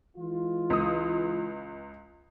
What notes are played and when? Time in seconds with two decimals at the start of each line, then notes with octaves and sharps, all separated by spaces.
0.17 E3 G#3 F4
0.70 C#2 D#6